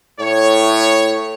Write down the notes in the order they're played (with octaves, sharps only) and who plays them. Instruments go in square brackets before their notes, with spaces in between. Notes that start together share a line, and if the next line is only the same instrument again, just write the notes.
[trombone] A2 [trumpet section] C#5